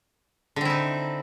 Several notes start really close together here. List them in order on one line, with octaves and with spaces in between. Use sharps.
D3 C4 E4 D#4